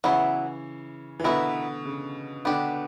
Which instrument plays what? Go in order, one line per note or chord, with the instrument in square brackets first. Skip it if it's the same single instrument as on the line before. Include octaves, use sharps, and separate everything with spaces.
[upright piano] C#3 E3 [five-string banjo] F#3 B3 E4
[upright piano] E3
[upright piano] B2 D3 [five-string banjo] B3 E4 A#4
[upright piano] C#3
[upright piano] B2 D3 [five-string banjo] B3 D4 G4